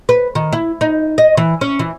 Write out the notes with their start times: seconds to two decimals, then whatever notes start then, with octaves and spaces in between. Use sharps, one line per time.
0.09 B4
0.35 D#3
0.53 E4
0.81 D#4
1.18 D#5
1.37 E3
1.61 C#4
1.79 E3